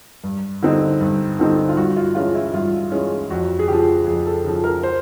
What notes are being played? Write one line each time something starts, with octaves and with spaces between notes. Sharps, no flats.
G2
D3 G3 C4 D#4
G2
D3 G3 C4 D#4
F4
G2 F#4
F4
E3 G#3 C#4 F4
E4
G2 F4
E3 G#3 C#4
F2 F#4
G#4
C#3 F3 G4
F2 G#4
A4
C#3 F3
A#4
C5